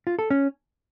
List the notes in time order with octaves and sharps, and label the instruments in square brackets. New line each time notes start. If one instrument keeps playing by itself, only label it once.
[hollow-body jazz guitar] F4
A4
C#4